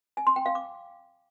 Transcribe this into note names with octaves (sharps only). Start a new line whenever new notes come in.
G#5
C6
G5
F5
D6